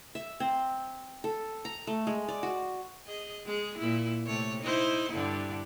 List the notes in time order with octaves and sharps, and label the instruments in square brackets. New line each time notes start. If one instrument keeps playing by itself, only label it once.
[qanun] E5
C4
A4
A#5
A3
G#3
D5
F#4
[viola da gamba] G#4 D#5
G#3 G#4
A#2 E4
C3 A3 C#5
D#4 E4 C5
G2 D3 E4